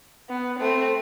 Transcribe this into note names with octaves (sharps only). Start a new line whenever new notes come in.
B3
A3 C4